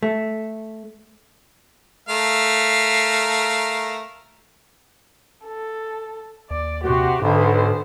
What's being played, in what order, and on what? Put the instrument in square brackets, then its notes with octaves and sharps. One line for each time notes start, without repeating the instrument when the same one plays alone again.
[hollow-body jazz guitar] A3
[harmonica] A3 A#4 F5
[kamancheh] A4
[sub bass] D#2 [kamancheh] D5
[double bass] C3 [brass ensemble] F#4 [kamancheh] G4 C6
[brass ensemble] B1 [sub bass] G#2 [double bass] D3 [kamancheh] B3 C5